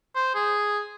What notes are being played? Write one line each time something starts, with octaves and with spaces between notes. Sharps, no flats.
C5
G#4